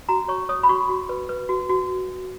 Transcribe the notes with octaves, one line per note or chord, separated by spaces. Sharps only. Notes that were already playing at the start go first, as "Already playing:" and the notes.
F#4 A#5
C#5 C#6
C#5 D#6
B5
F#4 C#6
F#4
B4
B4
F#4
F#4